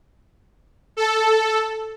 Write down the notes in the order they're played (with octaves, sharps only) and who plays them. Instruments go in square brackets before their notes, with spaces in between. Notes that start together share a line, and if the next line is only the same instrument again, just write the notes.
[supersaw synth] A4